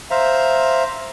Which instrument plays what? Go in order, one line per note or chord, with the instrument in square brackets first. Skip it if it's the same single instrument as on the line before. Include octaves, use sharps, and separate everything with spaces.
[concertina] C5 E5 F5 A#5